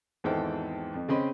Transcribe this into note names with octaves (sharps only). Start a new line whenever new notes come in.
G#1 E2 G#2 A4 C5 G5
F2
C#3 C4 C#4 D#5 B5 C6